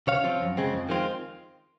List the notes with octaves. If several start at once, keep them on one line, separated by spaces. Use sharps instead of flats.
C#3 C#5 F5
F3 C4 F4
F#2
C#3 G#3 C4
F2
D#3 G#3 C4 F4